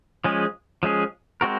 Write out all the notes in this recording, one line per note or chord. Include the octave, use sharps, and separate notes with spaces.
F3 G#3 C#4 G#4
F3 G#3 C#4 G#4
G#3 C4 F#4 A#4